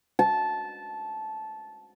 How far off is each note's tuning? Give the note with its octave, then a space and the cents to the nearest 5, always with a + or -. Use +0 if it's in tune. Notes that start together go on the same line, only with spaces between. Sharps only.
A5 -15